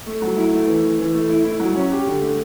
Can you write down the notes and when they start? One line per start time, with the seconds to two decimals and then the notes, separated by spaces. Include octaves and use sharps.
0.06 A3
0.22 F#3
0.37 E4
0.53 A3
0.67 E3
0.83 E3
0.98 E3
1.14 A3
1.29 E4
1.44 E4
1.60 F#3
1.75 C#4
1.91 G4
2.06 D3
2.21 A3